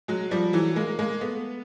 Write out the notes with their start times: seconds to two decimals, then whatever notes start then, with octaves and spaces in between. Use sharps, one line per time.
0.08 F#3 G#3
0.31 F3 G3
0.53 E3 F#3
0.76 G#3 A#3
0.99 G#3 A#3
1.21 A3 B3